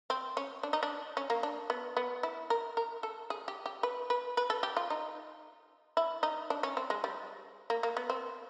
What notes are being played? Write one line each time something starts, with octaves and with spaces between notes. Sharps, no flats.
C4
C#4
D4
D#4
D4
C#4
A#3
D4
B3
B3
E4
A#4
A#4
A4
G#4
G4
G4
B4
B4
B4
A4
G4
F4
D#4
E4
D#4
D4
C#4
C4
G#3
G3
A#3
A#3
B3
C4